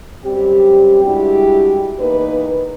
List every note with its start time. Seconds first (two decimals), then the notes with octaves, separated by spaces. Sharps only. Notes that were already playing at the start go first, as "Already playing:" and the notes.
0.25 F#2 G3 C4 G4
1.04 G3 G#3 D4 E4 F#4 G4
1.99 E2 A#3 D#4 B4